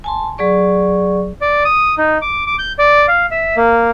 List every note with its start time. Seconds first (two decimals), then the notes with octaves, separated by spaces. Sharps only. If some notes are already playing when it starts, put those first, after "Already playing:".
0.04 G#5 A5 C6
0.38 F#3 G#4 D5 C#6
1.41 D5
1.65 D#6
1.98 D#4
2.22 D6
2.47 D6
2.59 G6
2.79 D5
3.08 F5
3.31 E5
3.57 A#3